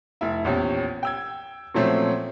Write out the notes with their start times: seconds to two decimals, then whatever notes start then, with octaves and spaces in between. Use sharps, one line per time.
0.21 F1 E4
0.44 A#1 E2 C#4 G4
1.03 G5 E6 G#6
1.75 A#2 F3 F#3 A3 C4 C#4